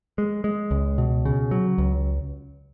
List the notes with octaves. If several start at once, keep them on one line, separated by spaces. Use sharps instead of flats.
G#3
G#3
C#2
B2
C#3
F#3
C#2